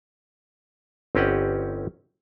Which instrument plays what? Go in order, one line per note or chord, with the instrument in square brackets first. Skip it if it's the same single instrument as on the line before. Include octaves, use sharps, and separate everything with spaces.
[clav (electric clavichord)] G1 C4 C#4 G4 D#5 F#5